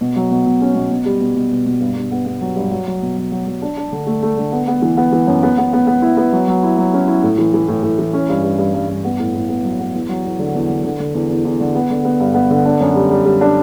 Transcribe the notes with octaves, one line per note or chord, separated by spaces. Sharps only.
B2
F#3
B2
B2
C#4
B2
B2
G3
B2
B2
B2
B2
G2
G2
B3
B3
F#3
G2
F#3
F#3
B2
F#3
F#3
F#3
D4
D4
D3
A3
A3
D3
B3
B3
E3
B3
E3
F#2
B3
B3
B3
B3
E4
B3
F#3
F#3
E4
F#3
C#4
E4
A2
E3
E3
A2
A2
E3
C#4
G2
G2
G2
G2
G2
B3
A2
A2
B3
F#3
B3
E2
F#3
E2
D3
E2
D3
D3
D3
E2
E2
E2
D3
B3
D3
B3
G2
B3
D3
D4
F#2
G3
G3
G3
D4